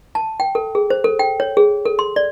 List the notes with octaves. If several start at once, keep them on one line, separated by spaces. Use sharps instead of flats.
A5
G5
A4
G#4
C5
A4
G5
C#5
G#4
A4
C6
D5